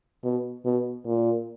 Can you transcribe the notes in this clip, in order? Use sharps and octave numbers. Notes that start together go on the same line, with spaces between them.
B2
B2
A#2